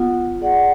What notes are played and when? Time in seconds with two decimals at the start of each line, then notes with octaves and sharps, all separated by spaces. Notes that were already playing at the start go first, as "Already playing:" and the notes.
Already playing: B3 F4
0.41 G#4 D5 F#5